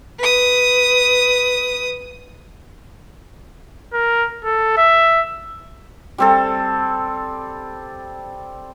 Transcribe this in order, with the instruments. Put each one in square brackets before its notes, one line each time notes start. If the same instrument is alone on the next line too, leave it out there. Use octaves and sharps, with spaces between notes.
[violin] B4 D#6
[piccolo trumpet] A#4
A4
E5
[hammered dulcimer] G3 C4 A4